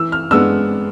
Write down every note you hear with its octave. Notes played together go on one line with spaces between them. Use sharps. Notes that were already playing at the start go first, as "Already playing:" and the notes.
Already playing: E3 E6
F6
G#3 B3 D4 E6